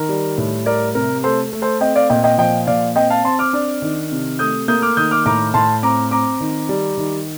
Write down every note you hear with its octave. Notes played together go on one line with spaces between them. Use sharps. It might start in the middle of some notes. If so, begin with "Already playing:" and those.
Already playing: D#3 A#4
G3
A2
G3 A#4 D5
C3 A#4
A3 A4 C5
A3
A4 C5
C4 D#5 G5
D5 F5
A#2 D#5 G5
D#5 G5
F3 D#5 G5
A#2 D5 F5
C4 D#5 G5
F5 A5
C4 A5 C6
D6 F6
D4
D#3
C3
A3 D#6 G6
A#3 D#6 G6
D6 F6
D#3 D#6 G6
D6 F6
A2 A#5 D6
A2 A5 C6
C4 A#5 D6
C4 A#5 D6
D#3
G3
D#3